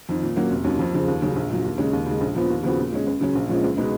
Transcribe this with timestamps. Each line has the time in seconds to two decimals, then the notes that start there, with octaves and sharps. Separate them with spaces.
0.09 F2 D#3
0.22 A#2
0.36 F#3 A#3 C#4 F#4
0.50 F1
0.64 D#2 D#3 F#3 C#4
0.79 F2
0.93 C#3 F3
1.08 D#2
1.22 C#3 F#3 C#4
1.36 A#1
1.50 A#2 F#3
1.65 D#2
1.78 C#3 G#3 C#4
1.93 D#2
2.06 C#3 G#3
2.21 A#1
2.35 A#2 F3 B3
2.50 D#2
2.63 C#3 F3 B3 F#4
2.78 A#2
2.92 G#3 C#4
3.07 C#2
3.21 C#3 F#3 C#4
3.35 A#1
3.49 A#2 F3 G#3 C#4
3.64 C#2
3.77 B2 G#3 B3 D#4